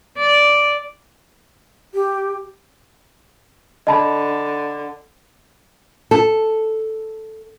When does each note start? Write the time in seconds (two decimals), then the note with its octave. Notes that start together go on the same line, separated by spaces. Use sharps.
0.17 D5
1.94 G4
3.87 D3 D#5 A5 B5
6.11 A4